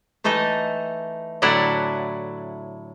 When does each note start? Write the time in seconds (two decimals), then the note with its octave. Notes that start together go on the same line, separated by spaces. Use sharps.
0.24 E3 A3 D#4 A4 D#5
1.42 A2 D3 F#3 E4 D5 F#5